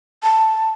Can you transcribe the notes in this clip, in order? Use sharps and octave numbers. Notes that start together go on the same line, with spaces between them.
A5